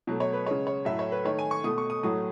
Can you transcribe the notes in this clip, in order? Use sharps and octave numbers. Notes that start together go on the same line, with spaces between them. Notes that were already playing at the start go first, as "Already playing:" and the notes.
B2 F#3 A3
C#5
B4
C#3 G#3 C#5
C#5
A2 F#3 A3 E5
C#5
B4
D#3 A3 C#5
G#5
C#6
B2 A3 D#6
C#6
D#6
A2 F#3 A3 D#6